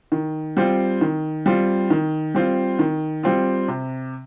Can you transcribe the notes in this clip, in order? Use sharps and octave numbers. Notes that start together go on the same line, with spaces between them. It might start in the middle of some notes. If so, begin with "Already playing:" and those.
D#3
G3 C4 F4
D#3
G3 C4 F4
D#3
G3 C4 F4
D#3
G3 C4 F4
C3